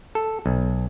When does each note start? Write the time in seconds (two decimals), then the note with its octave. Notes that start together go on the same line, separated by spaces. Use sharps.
0.15 A4
0.46 B1